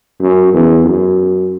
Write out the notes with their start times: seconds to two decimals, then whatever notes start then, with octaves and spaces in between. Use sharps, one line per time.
0.21 F#2
0.54 E2
0.86 F#2